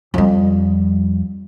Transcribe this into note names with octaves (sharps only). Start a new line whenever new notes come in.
F2 G3